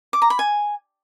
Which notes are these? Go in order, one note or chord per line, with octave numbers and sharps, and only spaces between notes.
D6
A#5
B5
G#5